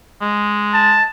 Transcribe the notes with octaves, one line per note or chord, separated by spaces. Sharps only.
G#3
A5